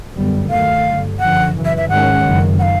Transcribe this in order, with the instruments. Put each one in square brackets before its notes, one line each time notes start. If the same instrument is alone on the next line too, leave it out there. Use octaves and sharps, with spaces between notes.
[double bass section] G1 F#2 D3 G3 B3
[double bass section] D#2 D#3 F#3 A3 [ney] F5
[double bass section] G1 G2 D3
[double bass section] F#2 D3 F3 [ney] F#5
[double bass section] F#2 C#3 E3
[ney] E5
E5
[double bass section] G#2 D#3 G#3 C#4 [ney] F#5
[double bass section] F#1 F#2 D#3
[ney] F#5
F5